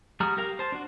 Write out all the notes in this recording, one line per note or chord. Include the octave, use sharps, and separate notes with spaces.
G3 F#4 G#4 A#5 F6
G4 A#4 F5
C5 A5
D4 F#4